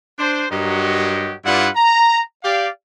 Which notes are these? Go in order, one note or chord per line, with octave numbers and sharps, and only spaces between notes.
D4 C5
G2 F#3 F#4 G4 A#4 D#5
G2 E4 F4 B4 D5 F#5
A#5
G4 D5 F5